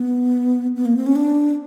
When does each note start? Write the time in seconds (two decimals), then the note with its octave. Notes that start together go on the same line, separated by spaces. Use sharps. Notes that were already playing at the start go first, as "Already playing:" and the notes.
Already playing: B3
0.76 B3
0.85 A#3
0.97 C4
1.06 C#4
1.16 D4